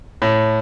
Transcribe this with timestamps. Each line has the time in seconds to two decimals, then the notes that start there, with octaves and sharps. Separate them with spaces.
0.22 A2